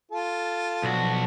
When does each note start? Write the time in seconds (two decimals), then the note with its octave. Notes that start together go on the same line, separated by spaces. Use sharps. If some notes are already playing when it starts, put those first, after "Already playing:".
0.12 F4 A4
0.83 B1 F3 D4 F#4